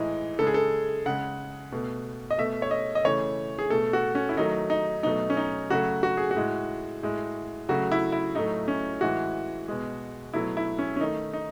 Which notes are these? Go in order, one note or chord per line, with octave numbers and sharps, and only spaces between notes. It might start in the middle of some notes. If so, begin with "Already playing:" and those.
Already playing: A2 E3 G#3 D#4
C#3 G#3 A4
G#4
A4
C#3 G#3 F#5
B2 A3
D#5
B2 A3 E5
C#5
D#5
D#5
C#3 E3 A3 C#5
G#4
B2 A3 A4
F#4
C#4
E4
D#3 F#3 A3 D#4
D#4
B2 F#3 A3 D#4
C#4
D#4
C#3 F#3 A3 F#4
F#4
G#4
F#4
A2 G#3
A2 G#3
C#3 F#3 A3 F#4
E4
E4
A2 F#3 A3 D#4
C#4
A2 E3 G#3 F#4
B2 G#3
B2 F#3 A3 E4
E4
C#4
C#4
D#3 A3 D#4
D#4